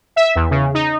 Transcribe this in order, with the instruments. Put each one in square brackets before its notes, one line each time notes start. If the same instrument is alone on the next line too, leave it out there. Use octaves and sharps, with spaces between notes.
[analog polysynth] E5
E2
C#3
D#4